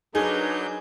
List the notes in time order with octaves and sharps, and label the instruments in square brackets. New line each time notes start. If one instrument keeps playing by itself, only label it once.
[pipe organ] F#3 G6 [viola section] D4 A#4 B4 [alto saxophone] D#4 [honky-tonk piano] G#4